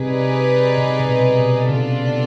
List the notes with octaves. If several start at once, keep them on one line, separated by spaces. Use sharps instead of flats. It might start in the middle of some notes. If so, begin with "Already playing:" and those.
Already playing: C3 D#4 G#4 B4 D5
C3
C3
B2
B2
C#3 B3 D4 F4 A4 D5